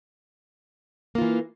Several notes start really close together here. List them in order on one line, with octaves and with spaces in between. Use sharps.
A#3 F4 E3